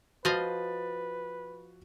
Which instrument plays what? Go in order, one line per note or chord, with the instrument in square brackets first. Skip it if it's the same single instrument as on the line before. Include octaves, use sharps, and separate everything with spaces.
[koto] F3 D#5 F5 [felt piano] F#4 A6 [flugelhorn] B4